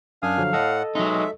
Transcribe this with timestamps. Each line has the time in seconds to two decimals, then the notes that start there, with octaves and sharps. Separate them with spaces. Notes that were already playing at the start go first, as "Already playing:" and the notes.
0.23 F#2 D4 F5 G#5 D#6
0.38 D3 F3 F#3
0.53 A2 A4 D#5 F#5
0.95 F#3 G#3 D#4 E5